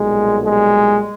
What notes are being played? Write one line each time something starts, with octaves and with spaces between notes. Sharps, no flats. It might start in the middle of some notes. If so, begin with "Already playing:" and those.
Already playing: B1 A#2 G3 G#3
G#3